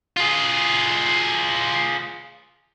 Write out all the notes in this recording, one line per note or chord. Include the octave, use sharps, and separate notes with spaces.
F4 G#4